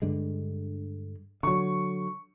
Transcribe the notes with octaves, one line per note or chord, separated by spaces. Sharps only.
G2 D3 G#3
D3 F#3 C#6